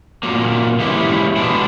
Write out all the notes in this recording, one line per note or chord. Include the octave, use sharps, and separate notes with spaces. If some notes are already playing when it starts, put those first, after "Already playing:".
A#2 F#3 A#3
E3 G#3 C#4 E4 G4
B2 G#3 B3 D4